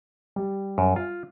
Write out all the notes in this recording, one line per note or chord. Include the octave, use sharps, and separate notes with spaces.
G3
F#2
F4